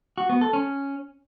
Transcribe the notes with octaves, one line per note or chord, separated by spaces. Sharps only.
F#4
B3
A4
C#4